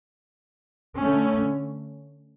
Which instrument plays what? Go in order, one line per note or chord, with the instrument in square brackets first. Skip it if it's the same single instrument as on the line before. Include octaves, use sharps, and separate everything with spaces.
[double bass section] D3 A3 C#4